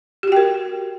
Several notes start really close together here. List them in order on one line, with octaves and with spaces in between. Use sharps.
G4 F#4 G5 A#4